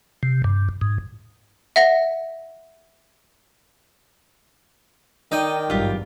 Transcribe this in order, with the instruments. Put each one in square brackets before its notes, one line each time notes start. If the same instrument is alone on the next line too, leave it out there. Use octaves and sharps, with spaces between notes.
[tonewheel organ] C3
G2
G#2
[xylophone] E5 F#5 A#6
[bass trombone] D#3 [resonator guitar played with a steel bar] D#4 D#5 [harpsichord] D5 G5
[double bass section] G#1 G2 F#3 [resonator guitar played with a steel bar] F4 G4